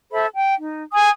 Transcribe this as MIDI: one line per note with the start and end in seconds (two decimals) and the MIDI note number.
0.12 0.26 69
0.12 0.26 72
0.12 0.26 76
0.12 0.26 83
0.34 0.54 79
0.59 0.82 63
0.93 1.10 80
0.93 1.10 87